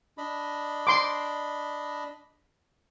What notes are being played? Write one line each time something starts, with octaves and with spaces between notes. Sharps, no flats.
D4 D#5 B5
C6 D6